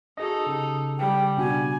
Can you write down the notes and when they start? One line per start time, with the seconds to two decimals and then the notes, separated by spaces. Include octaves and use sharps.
0.17 D#4 F#4 G#4 A4 D#5
0.46 C#3 G4
0.99 G3 G5
1.38 B2 D4 F#4 G#5